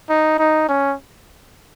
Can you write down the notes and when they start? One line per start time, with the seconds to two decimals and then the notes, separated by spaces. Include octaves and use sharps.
0.09 D#4
0.39 D#4
0.69 C#4